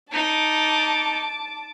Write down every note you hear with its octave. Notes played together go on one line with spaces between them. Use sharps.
D#4 A5 D6